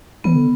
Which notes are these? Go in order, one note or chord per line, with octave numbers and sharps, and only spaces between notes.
E3 B3
D3